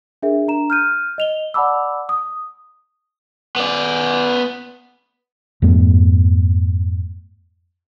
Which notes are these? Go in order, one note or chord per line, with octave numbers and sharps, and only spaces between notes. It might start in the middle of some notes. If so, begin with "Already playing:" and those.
D4 G#4 A#4 E5
D4 A#5 E7
F6 G6 D#7
D#5 F7 G7
D5 F#5 A5 B5 D6 E6
D#6
B3 D5
F2 G#2 A3 B3